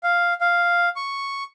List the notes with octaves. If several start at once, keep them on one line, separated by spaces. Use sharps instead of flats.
F5
F5
C#6